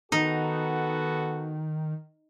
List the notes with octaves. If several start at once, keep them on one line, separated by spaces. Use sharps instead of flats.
D#3 B3 D#4 F#4 A4